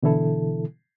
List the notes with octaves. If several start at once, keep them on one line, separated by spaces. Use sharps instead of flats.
B2 D3 E3 E4 A4